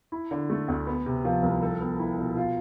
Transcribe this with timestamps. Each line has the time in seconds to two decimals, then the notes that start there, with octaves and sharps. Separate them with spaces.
0.12 E4
0.31 D3
0.50 A3
0.68 D2
0.87 B3
1.06 C3
1.25 F3
1.43 C2
1.62 A4
1.81 B3
1.99 E4
2.18 B2
2.37 F4